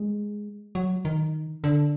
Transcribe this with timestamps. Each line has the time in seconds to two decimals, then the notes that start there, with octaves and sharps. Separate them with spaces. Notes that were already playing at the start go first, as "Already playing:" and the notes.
Already playing: G#3
0.75 F#3
1.05 D#3
1.64 D3